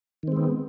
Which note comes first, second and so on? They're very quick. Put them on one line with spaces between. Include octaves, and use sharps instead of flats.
D#3 C4 G#3 B3